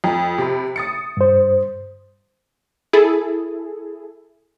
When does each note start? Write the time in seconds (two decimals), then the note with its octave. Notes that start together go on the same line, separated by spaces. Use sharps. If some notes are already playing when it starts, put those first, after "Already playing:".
0.04 F2
0.38 C3 B5
0.76 D#6 A6 C#7
1.17 G2 C5
2.93 E4 G#4 A4